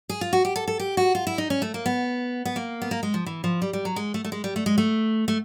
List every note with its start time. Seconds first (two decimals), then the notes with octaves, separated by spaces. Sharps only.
0.09 G#4
0.21 F4
0.33 F#4
0.45 G4
0.56 A4
0.68 A4
0.79 G4
0.97 F#4
1.15 F4
1.27 E4
1.38 D#4
1.50 C#4
1.62 A3
1.74 A#3
1.86 B3
2.45 B3
2.56 A#3
2.82 B3
2.91 A#3
3.03 G#3
3.14 F3
3.26 E3
3.44 F3
3.62 G3
3.73 G3
3.85 F#3
3.96 G#3
4.14 A3
4.24 A3
4.32 G#3
4.44 G3
4.56 A3
4.66 G#3
4.78 A3
5.28 A3